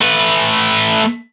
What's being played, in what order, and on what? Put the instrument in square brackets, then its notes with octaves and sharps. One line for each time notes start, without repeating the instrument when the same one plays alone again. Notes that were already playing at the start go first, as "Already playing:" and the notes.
[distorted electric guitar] A3 B4